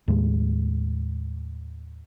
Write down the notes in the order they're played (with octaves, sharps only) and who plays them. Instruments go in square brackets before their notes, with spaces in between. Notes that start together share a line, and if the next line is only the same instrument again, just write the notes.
[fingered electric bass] D#2 A2 G#3